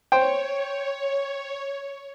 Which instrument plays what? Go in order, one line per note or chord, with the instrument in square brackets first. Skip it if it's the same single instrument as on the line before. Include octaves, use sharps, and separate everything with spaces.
[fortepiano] C5 G5 [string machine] C#5